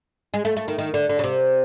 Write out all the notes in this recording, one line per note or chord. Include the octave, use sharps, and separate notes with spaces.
G#3
A3
A3
D#3
D#3
D3
D3
C#3
C3